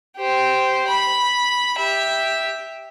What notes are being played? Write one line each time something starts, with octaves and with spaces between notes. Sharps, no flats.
G4 C5
B5
G4 E5